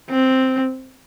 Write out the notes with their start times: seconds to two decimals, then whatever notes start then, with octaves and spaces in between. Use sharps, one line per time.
0.10 C4